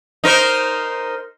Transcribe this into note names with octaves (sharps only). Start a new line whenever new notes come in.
D#4 A#4 C5